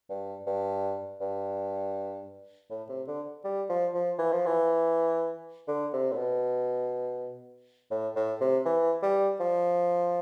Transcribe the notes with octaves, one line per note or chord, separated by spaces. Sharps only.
G2
G2
G2
A2
C3
D3
G3
F3
F3
E3
F3
E3
D3
C3
A2
B2
A2
A2
C3
E3
G3
F3